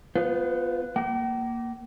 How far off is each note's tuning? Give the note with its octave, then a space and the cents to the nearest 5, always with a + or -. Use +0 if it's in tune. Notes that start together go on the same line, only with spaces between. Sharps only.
B3 +0 F4 +0 C5 -35
A#3 +0 G5 -45